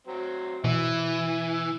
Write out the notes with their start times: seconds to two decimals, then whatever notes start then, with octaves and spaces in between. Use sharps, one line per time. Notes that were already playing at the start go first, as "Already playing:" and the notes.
0.07 F#3 C4
0.64 B2 E3 E5
1.54 E6